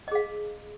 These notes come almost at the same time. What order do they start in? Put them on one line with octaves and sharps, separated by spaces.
D#5 G#4 F5